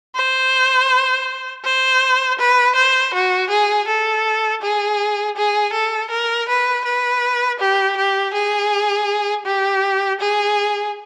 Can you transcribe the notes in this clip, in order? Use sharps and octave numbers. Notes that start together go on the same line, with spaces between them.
C5
C5
B4
C5
F#4
G#4
A4
G#4
G#4
A4
A#4
B4
B4
G4
G4
G#4
G4
G#4